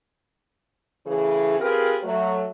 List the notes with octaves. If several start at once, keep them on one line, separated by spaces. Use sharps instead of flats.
A2 C#3 E3 G#4
C4 F4 G4 G#4 A#4 B4
F#3 A3